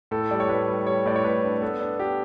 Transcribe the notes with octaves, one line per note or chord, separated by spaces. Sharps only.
A2 A4
G3 D5
C#5
A2 B4
G3
G3 C#5
A2 D5
C#5
A2 B4
D4
B3 A4
D4
B3 G4